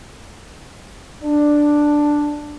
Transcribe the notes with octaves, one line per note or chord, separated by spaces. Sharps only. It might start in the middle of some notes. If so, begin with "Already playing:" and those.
D4